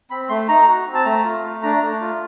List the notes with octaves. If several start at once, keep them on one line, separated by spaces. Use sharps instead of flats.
C4 B5
A3 C6
D#4 A#5
F#4
C4
A5
A3 A#5
F4
A3
D4 A#5
A3
F4